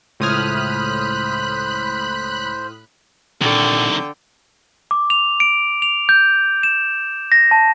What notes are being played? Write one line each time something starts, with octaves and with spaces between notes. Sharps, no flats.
C#2 A2 C5 B5 D#6 F6 F#6 G#6
C2 A#2 D3 D#3 G5
D6
F7
D7
F7
G6
E7
A#6
A5